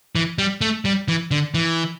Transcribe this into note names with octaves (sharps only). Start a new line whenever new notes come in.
E3
G3
A3
G3
E3
D3
E3